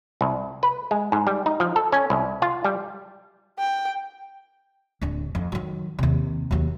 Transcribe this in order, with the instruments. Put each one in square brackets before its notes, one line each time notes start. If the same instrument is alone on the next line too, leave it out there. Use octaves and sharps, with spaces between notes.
[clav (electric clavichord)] C2
B4
G#3
G#2
G3
D#4
F3
A4
C#4
C2
F4
G3
[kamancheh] G5
[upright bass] D1 D3
F2
D#3 F#3
D#2 C3
D#2 F#3